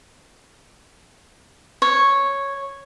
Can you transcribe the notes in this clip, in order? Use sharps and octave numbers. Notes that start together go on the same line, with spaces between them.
C#5